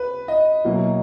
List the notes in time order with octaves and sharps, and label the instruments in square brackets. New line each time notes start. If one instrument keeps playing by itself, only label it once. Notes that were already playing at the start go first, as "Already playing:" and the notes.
Already playing: [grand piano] B4
D#5
B2 F#3 A#3 E4